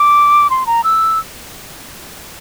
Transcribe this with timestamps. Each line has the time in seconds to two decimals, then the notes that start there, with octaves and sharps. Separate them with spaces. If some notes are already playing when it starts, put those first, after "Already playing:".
Already playing: D6
0.50 C6
0.67 A#5
0.84 E6